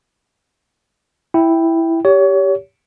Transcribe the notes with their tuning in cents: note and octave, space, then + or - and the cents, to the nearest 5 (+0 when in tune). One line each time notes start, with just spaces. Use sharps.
E4 +0 G5 +0
G4 +0 C#5 +30